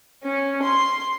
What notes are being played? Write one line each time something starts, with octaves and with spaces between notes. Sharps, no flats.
C#4
C6